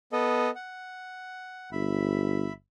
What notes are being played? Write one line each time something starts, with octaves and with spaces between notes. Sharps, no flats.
B3 A4 D#5
F#5
G1 E5 B5